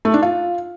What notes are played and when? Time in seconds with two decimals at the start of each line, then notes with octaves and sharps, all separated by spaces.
0.05 A3
0.14 D4
0.22 F4